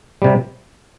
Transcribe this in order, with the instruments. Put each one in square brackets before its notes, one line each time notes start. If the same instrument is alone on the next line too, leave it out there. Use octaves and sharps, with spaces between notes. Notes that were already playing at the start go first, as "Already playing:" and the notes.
[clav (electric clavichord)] C3 G3